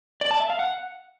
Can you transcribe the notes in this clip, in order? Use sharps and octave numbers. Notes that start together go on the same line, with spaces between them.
D5
A5
E5
F5
F#5